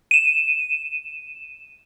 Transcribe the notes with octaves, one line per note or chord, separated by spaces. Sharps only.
D#7 E7